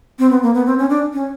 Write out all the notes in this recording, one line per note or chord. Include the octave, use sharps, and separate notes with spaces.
C4
B3
A#3
B3
C4
C#4
D4
C#4